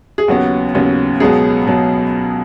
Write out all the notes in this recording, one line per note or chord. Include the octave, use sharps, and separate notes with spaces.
G#4
D#2 C#3 F#3 B3 F#4
D#2 C#3 F#3 B3
C#2 B2 F#3 B3 G#4
B2 F#3 B3